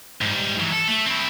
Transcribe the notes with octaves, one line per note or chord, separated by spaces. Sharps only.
G#2 G3
E3 F#3
A4
A3
C4 E4